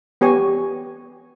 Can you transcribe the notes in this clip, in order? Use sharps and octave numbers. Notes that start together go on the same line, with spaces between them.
B3 G4 C#5 G#5